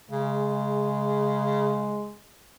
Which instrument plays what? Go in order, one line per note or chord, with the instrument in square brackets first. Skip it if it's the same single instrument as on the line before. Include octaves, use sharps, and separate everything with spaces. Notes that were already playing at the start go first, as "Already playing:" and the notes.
[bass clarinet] C#3 [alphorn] G#3